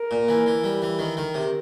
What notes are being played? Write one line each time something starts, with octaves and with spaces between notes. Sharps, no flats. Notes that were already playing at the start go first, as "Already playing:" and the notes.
Already playing: A#4
A#2
E3
E3
G3
E3
D#3 A#4
D#3
C3